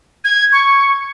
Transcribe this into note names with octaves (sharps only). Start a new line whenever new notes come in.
G#6
C#6